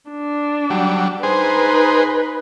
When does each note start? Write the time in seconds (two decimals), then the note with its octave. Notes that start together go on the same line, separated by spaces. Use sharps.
0.11 D4
0.70 F#3 G3
1.23 D#4 G#4 B4 C5